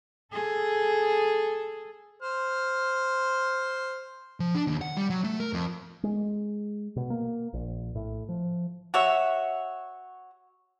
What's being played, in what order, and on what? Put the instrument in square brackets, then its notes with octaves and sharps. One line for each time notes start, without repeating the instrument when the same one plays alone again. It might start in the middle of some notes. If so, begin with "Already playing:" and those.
[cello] G#4 A4
[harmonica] C5 F6
[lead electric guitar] F3
D4
D#2
F#5
G3
F#3
A3
A#4
F2
[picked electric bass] G#3
B2
A#3
A#1
A2
F3
[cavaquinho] F#4 C#5 E5